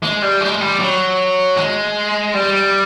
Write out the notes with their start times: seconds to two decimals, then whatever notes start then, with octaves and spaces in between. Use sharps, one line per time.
0.02 G#3
0.22 G3
0.41 G#3
0.61 G3
0.79 F#3
1.56 G#3
2.34 G3